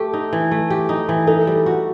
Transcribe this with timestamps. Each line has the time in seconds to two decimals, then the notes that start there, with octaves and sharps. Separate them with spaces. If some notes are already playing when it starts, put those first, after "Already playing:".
Already playing: A3 G4 A4
0.13 D#4
0.33 E3
0.51 A3
0.70 G4
0.89 D#4
1.09 E3
1.27 D#4 A4
1.47 G3
1.66 F#4